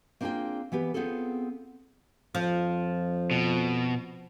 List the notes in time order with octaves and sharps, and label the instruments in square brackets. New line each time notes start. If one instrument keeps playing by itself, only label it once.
[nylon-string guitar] A#3 C4 D4 F4 G#4 G5
E3 B3 G4 B4
B3 C4 F4 G#4 A4
[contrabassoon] F2 [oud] F3
[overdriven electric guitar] B2